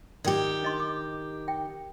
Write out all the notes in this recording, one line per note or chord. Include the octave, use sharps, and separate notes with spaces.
D#3 G4 D5 G5
D4 D#5 C6
D6
G5